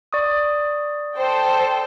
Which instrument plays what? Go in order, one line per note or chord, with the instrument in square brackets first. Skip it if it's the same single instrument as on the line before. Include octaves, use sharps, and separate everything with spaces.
[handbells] D5 C#6 D#6
[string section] A4 C5 G5